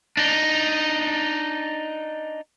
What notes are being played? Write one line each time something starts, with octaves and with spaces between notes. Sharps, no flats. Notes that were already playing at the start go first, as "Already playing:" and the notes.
D4 D#4